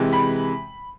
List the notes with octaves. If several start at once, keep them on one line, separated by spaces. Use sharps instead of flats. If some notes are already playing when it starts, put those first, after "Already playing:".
Already playing: C3 E3 G#3
B5